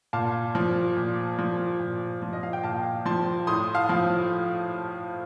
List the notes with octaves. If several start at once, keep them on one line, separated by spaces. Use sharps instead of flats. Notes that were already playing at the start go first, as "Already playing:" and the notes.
A#2 F5 A5
F3
A#2
F3
A#2
F3
D#5
F5
G5
A#2 F5 A5
F3 A5 C6
A2 C6 D#6
F5 A5
F3